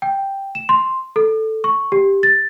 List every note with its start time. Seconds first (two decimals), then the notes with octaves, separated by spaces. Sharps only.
0.02 G5
0.55 E7
0.69 C6
1.16 A4
1.64 C#6
1.92 G4
2.23 A6